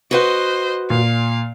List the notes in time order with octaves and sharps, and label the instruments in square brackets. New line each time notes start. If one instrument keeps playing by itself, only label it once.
[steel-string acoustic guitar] F#4 B4 F#5 [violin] C5 D#5
[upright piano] A#2 [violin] F5